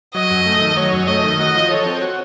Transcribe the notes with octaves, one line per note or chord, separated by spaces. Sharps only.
F#3 D#5
F#2
A3
D#3
F#3 C#5
F#2
A3 D#5
D#3
F#4 D#5
F3
A4 C#5
C4
F#4